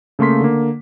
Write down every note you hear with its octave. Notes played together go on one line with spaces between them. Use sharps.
C#3 A3 A#3 C6 B6
D3 A#3